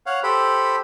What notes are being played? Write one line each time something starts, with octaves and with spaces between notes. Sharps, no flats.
C#5 F5 F#5
G4 A4 C5 B5